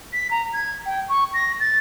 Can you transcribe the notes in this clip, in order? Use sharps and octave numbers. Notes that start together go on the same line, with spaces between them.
B6
A#5
G#6
G5
C#6
A#6
A6